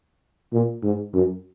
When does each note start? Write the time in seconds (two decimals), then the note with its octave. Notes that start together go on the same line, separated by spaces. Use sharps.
0.53 A#2
0.83 G#2
1.14 F#2